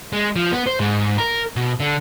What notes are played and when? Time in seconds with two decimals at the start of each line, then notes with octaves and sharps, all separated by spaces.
0.13 G#3
0.36 F3
0.52 B3
0.67 C5
0.80 G#2
1.18 A#4
1.56 B2
1.80 D3